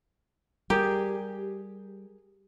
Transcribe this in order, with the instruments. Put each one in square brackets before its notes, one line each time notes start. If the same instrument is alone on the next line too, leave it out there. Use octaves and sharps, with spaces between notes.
[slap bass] G3 [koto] G4 [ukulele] G#4 A#4